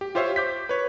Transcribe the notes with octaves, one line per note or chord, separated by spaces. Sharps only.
G4
F4 G4 C5 C#5 E5 F5
D6 G6 B6
B4 C#5